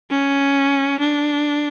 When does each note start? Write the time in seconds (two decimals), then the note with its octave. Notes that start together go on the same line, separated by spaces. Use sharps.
0.10 C#4
0.99 D4